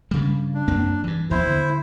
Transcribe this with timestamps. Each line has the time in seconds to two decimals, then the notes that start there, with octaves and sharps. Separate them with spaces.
0.11 G2 C#3 G3
0.54 D4
0.68 F#2 A#3 C4
1.04 G2 E3
1.31 D#2 F3 B3 E4 C5
1.47 D3